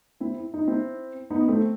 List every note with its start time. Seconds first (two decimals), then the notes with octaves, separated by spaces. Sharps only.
0.20 C4 E4
0.39 E4
0.54 D#4
0.67 C4 E4
1.30 B3 D#4
1.48 A3 C4